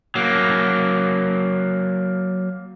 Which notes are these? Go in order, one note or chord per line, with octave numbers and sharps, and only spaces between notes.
F#3 A#3